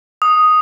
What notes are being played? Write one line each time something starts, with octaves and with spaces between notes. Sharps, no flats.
D#6